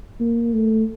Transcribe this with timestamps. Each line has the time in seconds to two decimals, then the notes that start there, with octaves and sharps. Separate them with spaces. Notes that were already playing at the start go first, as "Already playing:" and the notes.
0.20 A#3
0.54 A3